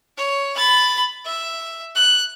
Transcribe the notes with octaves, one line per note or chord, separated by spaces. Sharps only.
C#5
B5 A6
E5
F#6